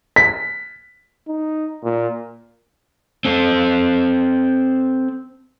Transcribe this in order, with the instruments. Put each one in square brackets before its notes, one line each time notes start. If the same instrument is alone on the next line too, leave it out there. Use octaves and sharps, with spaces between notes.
[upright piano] B6
[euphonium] D#4
A#2
[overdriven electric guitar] C4 A4